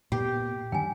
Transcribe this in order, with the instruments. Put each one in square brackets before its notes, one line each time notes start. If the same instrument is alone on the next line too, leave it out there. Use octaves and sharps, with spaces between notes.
[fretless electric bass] A#2 A#3 B3 [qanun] G4
[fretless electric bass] D3 D#3 G3 [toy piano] G5 G#5